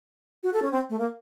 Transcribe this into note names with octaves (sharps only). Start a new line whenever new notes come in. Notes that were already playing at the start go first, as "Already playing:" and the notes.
F#4
A4
C#4
C4
A3
A#3